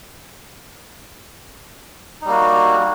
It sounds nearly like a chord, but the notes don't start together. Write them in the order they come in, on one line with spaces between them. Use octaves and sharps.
D#4 G3 A#3 F#4